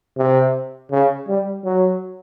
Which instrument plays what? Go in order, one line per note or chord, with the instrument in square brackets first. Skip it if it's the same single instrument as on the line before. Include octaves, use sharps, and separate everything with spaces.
[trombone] C3
C#3
G3
F#3